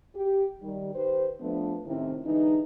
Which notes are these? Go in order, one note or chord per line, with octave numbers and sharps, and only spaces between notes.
G4
D#3 G3
D#3 G4 B4 C5
F3 A3 B3 D4
A2 C3 D#3 C4 C#4 E4
D3 E3 G#3 D#4